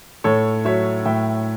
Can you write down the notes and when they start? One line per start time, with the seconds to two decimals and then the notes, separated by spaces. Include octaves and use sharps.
0.24 A2 A4 C#5
0.65 F#3 C#5 E5
1.05 A2 E5 G5